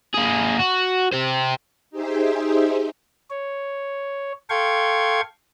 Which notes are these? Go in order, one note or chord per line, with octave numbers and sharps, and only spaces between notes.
A#3 G#4
F#4
G4 C5
D#4 G4 G#4 C5 E5
C#5
A4 F5 G5 C6 C#6 G#6